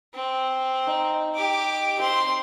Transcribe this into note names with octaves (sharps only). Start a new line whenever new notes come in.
C4
D#4
G4 D6
C4 G5 C6